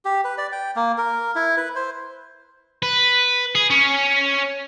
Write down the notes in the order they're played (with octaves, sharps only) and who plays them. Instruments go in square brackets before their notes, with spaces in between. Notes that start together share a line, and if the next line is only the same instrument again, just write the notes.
[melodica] G4
B4
D5
G5
A#3
A#4
E4
B4
C5
[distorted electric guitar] B4
G#4
C#4